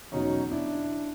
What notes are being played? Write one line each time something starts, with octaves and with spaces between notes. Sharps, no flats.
E2 B2 F#3 C#4 D#4
D4 E4